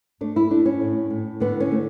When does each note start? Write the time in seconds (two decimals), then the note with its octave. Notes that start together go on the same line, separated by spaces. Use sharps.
0.21 A3 D4
0.36 E4
0.50 A3 D4
0.66 C#4
0.81 A2
1.10 A2
1.40 D3 B3
1.60 C#4
1.71 A3